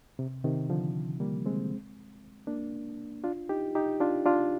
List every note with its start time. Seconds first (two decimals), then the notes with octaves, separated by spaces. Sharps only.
0.19 C3
0.44 C3 D#3
0.70 D3 F3
1.20 G3 A#3
1.46 G#3 C4
2.47 A#3 D4
3.24 D4 F4
3.49 D#4 G4
3.75 D#4 G4
4.01 D4 F4
4.26 D4 F4